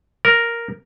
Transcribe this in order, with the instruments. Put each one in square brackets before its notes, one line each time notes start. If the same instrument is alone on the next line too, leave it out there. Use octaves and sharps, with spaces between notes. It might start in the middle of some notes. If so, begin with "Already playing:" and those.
[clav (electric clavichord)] A#4